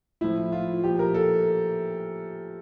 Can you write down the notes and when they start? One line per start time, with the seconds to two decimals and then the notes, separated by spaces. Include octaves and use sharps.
0.21 A2 F3 E4
0.52 F4
0.84 A#2 F3 G4
0.99 A#4
1.14 A4